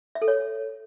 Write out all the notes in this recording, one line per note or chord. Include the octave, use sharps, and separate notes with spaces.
E5
A4
C#5